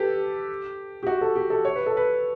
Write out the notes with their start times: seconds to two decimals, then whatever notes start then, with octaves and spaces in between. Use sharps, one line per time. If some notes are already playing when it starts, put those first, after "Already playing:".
Already playing: G4 A4 B4
1.03 G4
1.07 F#4
1.21 A4
1.36 G4
1.50 A4
1.65 C#5
1.76 B4
1.86 A4
1.97 B4